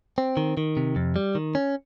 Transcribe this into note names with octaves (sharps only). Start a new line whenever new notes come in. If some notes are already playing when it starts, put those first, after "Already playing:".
C4
D#3
D#3
C3
F2
G3
D#3
C#4